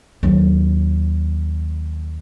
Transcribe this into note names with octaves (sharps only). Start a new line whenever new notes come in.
D#2 F#3